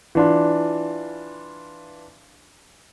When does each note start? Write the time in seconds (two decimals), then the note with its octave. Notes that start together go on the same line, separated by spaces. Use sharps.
0.15 E3 D4 F4